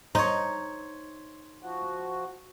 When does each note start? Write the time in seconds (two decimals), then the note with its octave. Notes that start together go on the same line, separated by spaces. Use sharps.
0.15 D#4 C5 C#5
1.62 F3 F#4